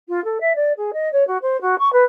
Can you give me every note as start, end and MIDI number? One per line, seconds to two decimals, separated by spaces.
0.08 0.22 65
0.24 0.38 69
0.40 0.53 76
0.55 0.72 74
0.77 0.91 68
0.93 1.09 75
1.12 1.26 73
1.27 1.37 66
1.42 1.60 72
1.61 1.78 66
1.78 1.91 85
1.92 2.04 71